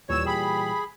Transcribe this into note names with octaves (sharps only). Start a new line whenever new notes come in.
D#2 A#2 E3 G3 C#5 E6 E7
G4 G#4 B5